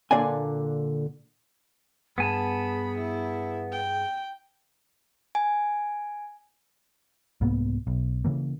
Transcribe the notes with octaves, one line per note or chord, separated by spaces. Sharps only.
A#2 D3 D4 D5 F5 G#5
G2 B3 G#4 G#5 A5 B5
E4
G5
G#5
C2 G#2 A#3 B3
B1
C#3 E3 A#3